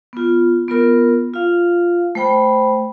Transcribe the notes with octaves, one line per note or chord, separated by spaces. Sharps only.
B3 F4
B3 F4 A#4
F4 F5
A3 C5 G5 B5